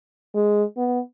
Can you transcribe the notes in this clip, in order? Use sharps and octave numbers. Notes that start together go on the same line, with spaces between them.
G#3
B3